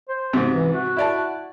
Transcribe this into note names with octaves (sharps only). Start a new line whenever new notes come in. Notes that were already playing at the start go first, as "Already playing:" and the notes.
C5
G#2 C3 F#3
E3
F#4
E4 D5 A5